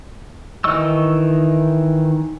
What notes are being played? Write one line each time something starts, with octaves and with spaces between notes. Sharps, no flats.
D#3 E3 D#5 C#6 E6